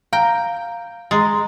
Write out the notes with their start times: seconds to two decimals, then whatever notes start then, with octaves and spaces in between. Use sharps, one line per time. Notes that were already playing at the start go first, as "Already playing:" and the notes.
0.13 F5 G5 A#5
1.11 G#3 A#5 C6 A6